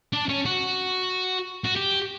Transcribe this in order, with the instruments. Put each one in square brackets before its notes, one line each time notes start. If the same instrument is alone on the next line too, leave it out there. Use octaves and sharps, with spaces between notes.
[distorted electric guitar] D4
C#4
F#4
F#4
G4